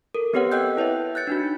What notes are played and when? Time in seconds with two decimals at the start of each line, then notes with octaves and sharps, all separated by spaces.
0.15 A4 A#4
0.33 B3 C4 G4 B4 C#5 F#5
0.51 A4 D#5 G5 E6 F#6 G6
0.77 E4 B4 C#5 E5
1.15 F#6 G6 A6 C#7
1.27 D4 D#4 F#4